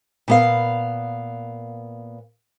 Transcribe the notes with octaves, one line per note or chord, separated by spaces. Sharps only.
A#2 B3 F5